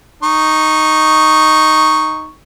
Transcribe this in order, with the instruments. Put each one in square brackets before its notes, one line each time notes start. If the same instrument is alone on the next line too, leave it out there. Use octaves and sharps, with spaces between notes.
[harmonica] D#4 C#6